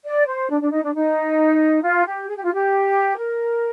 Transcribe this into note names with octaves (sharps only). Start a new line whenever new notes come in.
D5
C5
D4
D4
D#4
D4
D#4
F4
G4
G#4
G4
F4
G4
A#4